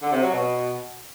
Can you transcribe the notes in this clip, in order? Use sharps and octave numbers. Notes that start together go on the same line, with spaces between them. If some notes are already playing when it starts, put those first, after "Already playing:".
D3
C3
F#3
B2